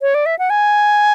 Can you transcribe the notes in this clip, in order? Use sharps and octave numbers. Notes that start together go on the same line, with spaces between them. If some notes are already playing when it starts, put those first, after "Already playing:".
C#5
D5
E5
F#5
G#5